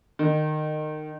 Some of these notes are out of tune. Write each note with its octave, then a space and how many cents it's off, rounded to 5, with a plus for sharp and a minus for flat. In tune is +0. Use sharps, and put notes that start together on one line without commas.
D#3 -25